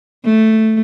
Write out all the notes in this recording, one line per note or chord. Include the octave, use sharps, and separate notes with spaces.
A3